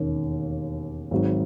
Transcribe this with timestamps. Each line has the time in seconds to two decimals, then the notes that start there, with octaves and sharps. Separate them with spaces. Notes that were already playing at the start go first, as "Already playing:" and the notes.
Already playing: E1 D#2 D#3 A#3 C#4
1.11 G#1 G#2 F#3